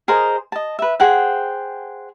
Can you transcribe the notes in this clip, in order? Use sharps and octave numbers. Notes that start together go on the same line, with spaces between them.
G#4 A#4 C5 D#5
D#5 A5
B4 E5
G#4 C5 F#5 G5